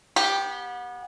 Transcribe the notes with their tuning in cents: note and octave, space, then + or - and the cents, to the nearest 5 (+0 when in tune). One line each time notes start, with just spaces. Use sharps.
B3 -30 G4 +0